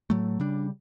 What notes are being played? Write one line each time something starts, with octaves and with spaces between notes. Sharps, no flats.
A2 F#3 A3
C#3 G3 D4